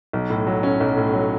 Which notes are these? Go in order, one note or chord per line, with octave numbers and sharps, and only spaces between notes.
B1
A2
F#3
C#4
B1
A2
F#3